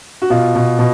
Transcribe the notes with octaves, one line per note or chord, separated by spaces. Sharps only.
F#4
B2 F4
B2
B2